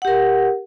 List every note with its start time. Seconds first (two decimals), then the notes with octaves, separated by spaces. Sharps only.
0.02 F#5
0.05 G4
0.08 A#4